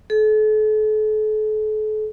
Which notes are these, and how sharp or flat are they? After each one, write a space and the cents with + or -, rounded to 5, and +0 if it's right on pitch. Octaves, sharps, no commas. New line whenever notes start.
A4 -40